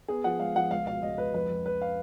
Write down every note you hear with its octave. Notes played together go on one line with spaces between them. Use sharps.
B3 G#4
F3 F#5
G#3 F5
F3 F#5
C#2 F5
B2 F5
C#2 D#5
C#2 B4
F2 B4
F2
F2 B4
F5